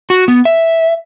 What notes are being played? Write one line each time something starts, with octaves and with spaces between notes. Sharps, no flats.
F#4
B3
E5